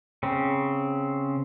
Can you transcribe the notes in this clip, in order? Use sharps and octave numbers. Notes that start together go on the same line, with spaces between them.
C#3 C4